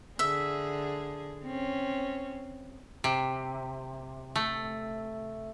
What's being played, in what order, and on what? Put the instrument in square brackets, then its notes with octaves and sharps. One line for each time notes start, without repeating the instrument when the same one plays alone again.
[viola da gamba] D3 G#4 [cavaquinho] E5
[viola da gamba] C4 C#4
[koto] C3
A3